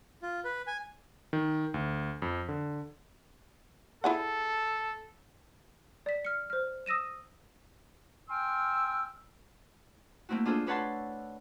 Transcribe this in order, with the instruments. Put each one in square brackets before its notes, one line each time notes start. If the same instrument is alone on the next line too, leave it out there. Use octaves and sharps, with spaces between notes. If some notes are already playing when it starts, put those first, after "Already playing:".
[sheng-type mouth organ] F4
B4
G#5
[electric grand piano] D#3
D2
F2
D3
[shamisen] E4 G#4 F#5 [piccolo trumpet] A4
[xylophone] D5 B6
F6 C#7
C5 F6
D#6 E6 A#6 D#7 E7
[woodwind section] G5 G#5 C6 E6 F6
[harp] A3 A#3 C4 E4 F#4
D4 F4 G#4 A4 C5
D4 B4 C#5 F#5 A5 C6